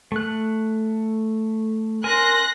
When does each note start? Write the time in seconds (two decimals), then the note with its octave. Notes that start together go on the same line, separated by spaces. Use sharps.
0.12 A3 F#6
2.04 A#4 G#5 C6 F#6 A#6